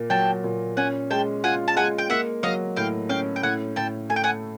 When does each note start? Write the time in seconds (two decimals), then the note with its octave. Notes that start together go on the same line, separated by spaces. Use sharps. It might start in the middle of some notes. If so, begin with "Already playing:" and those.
Already playing: A#2 A#3
0.10 F#3 G5 A5
0.44 A#2
0.77 C#4 F#5 G#5
1.10 G#3 G5 A5
1.44 F4 F#5 G#5
1.68 A5
1.76 G#3 F#5 G#5
1.98 G5
2.10 A#3 E5 F#5
2.43 F#3 D#5 F5
2.76 A2 F5 G5
3.09 C#4 F5 G5
3.36 G5
3.43 A2 F#5 G#5
3.76 A2 G5 A5
4.09 A3 G#5
4.16 G5
4.24 F#5 G#5